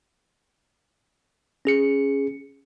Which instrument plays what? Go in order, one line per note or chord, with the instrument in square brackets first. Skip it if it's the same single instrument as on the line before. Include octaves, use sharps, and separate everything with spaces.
[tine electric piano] C#4 G#4 C#7